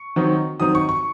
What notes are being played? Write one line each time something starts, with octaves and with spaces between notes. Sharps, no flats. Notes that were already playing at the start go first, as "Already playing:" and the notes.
Already playing: C#6
D#3 F#3 C4 D#4
D#3 F#3 C4 D#4 D#6
C#6
C#6